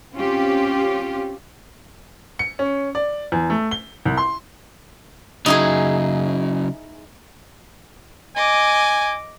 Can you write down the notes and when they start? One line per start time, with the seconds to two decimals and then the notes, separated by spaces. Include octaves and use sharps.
0.14 C4 C#4 F4 G4
2.39 C#7
2.59 C#4
2.95 D5
3.32 E2
3.50 A3
3.71 G7
4.05 C2
4.18 C6
5.46 C#3 F#3 D#4 E4 G#4
8.36 D#5 G#5 D6